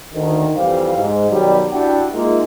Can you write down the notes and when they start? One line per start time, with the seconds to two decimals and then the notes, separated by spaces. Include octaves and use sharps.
0.14 D2 D#3
0.56 F2 E3 G3 G4 C5 F5
0.97 G#2
1.29 B2 D#3 F#3 G3
1.72 D4 E4 F#4 G4 F#5 G5
2.13 G#3 A#3 D#4 F4 E5